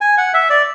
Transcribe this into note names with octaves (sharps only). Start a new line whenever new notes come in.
G#5
F#5
E5
D5